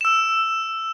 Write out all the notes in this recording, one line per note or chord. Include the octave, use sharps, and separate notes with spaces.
E6 E7